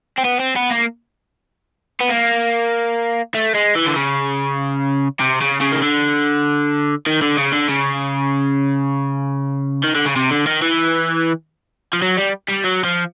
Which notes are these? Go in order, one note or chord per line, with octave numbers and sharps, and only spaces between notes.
C4
B3
C4
B3
A#3
B3
A#3
A3
G#3
E3
D3
C#3
C3
C#3
C#3
D#3
D3
D#3
D3
C#3
D3
C#3
D#3
D3
C#3
C3
D3
D#3
E3
F3
F#3
G3
G3
F#3
F3